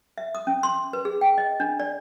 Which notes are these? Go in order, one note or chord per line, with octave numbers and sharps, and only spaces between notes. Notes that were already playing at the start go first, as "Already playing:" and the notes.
E5
D#6
C#4
C6
B4
G#4
G5
D#5
D4
D5